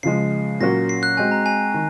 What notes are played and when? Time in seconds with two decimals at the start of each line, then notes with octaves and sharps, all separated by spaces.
0.03 C#3 F3 G#3 C7
0.60 A#2 F#3 A#3 C#4 F#4 A#6
0.89 C7
1.03 F#6
1.17 G#3 C4 F#4 G#5
1.31 A#5
1.46 G#5
1.74 D#3